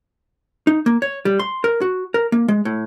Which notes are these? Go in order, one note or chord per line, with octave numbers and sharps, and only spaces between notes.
D#4
A#3
C#5
G3
C6
A#4
F#4
A#4
A#3
G#3
A2